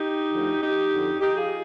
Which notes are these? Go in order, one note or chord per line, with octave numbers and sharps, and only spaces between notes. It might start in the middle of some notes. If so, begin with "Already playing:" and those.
Already playing: D#4 G4
D2 D3 F3
D#4 G4
F2 D3 F3
D#4 G4
F4 G#4